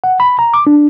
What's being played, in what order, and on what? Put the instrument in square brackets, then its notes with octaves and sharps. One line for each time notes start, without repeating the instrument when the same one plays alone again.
[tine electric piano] F#5
B5
A#5
D6
D4